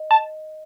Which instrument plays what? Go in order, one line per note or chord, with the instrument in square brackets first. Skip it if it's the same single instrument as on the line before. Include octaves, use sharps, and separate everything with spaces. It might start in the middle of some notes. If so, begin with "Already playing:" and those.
Already playing: [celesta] D#5
[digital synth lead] A5